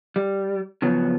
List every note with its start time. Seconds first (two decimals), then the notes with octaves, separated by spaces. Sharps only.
0.16 G3
0.82 C#3 F3 F#3 B3